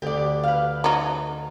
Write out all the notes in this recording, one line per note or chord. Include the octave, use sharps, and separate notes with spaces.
D2 G4 D5
B4 F5
F#3 D#4